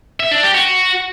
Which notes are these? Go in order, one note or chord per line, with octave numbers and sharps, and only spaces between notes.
E5
D4
G4
F#4